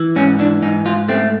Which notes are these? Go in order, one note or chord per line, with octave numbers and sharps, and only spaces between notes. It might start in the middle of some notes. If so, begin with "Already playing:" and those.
Already playing: E3
G#2 C#4
E3 D4
G#2 D#4
G#2 F4
A3 C4